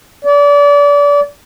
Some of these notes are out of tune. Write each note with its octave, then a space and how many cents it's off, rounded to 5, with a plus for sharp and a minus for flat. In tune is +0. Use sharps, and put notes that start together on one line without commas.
D5 -30